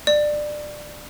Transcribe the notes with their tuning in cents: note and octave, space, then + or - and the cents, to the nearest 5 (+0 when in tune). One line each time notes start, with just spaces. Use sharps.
D5 +20